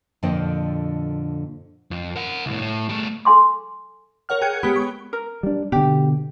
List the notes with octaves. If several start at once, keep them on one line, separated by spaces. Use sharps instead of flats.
F2 A#2 D3 C5 D#5 G5
F2
A#4 F#5
C2 A2
A2
G3 A3
A4 G#5 C6 D6
A#4 C#5 F#5 F6
G#4 G5 F#6 G#6 C#7
G#3 B3 G4 B5
C#6
A#4
G3 D4
B2 D3 G4